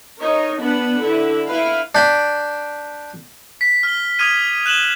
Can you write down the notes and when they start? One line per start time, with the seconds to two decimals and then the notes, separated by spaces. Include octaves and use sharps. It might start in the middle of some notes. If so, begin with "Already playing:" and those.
0.17 D#4 A#4 C#5
0.60 B3 D4 B4 F#5
1.01 D3 E4
1.47 E4 B4 F5
1.95 D4 G5 B5
3.61 B6
3.83 F6 G7
4.19 D6 D#6 F6 G#6 D#7
4.66 F#6 E7 F#7 G7